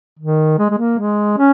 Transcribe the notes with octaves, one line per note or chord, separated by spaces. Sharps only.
D#3
G#3
G#3
A#3
G#3
C#4